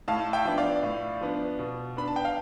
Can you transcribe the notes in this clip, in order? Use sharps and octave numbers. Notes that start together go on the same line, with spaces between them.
A2 F5 A5
E5 G5
F3 B3 D4
D5 F5
A2
F3 B3 D4
B2
B3 D4 B5
A5
G5
F5